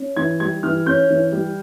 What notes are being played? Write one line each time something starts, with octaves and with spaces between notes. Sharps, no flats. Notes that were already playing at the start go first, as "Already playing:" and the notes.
Already playing: C#4
E3 G#6
G3 G#6
E3 F6
C#4 G6
E3
G3